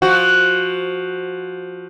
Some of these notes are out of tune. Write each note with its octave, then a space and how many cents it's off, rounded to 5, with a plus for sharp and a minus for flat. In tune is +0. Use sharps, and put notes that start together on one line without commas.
F3 +5 F#4 +0